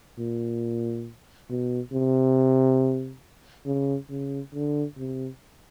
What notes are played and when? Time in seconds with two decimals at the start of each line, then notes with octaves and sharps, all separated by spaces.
0.18 A#2
1.50 B2
1.92 C3
3.66 C#3
4.10 C#3
4.54 D3
4.98 C3